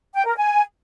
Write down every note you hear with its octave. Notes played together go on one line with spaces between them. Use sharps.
G5
A#4
G#5